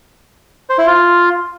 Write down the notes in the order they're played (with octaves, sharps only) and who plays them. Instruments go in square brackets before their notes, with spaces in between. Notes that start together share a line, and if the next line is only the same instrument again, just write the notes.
[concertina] C5
E4
F4